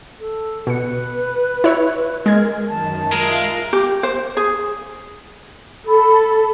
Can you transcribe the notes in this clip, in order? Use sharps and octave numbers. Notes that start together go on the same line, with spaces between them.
A4
B2 B4 C#7
E4 C#5
G#3 A#4 G#6
F#2 D#3 A5
G#3 F4 A#4 E5 F5
G4
C5
G#4
A4 B5